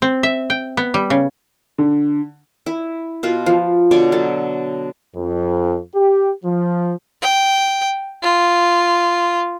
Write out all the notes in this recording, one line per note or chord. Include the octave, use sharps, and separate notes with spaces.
C4
E5
G5
B3
G3
C#3
D3
E4
B2 F4 B4
F3
B2 D3 C#5 D5
F#3 A4 A5
F2
G4
F3
G5
F4